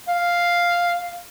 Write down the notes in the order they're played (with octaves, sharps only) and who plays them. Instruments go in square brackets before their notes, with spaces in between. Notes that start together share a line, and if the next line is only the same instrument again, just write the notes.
[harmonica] F5